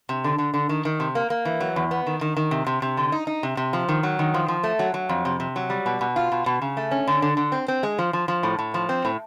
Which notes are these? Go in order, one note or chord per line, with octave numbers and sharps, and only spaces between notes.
C3
D3
D3
D3
D#3
D#3
C3
A#3
A#3
E3
F#3
E2
B3
D#3
D#3
D#3
C3
C3
C3
D3
D#4
D#4
C3
C3
F3
D#3
F#3
D#3
F3
F3
A3
F#3
F#3
F2
C3
C3
F#3
G3
B2
B2
F4
B2
B2
C#3
A3
C#4
D3
D3
D3
C4
C4
G#3
F3
F3
F3
A2
A2
F3
C4
A2